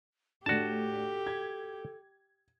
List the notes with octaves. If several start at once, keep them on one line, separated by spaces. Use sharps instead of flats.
A2 D4 F#4 G4 A4 A5
G#6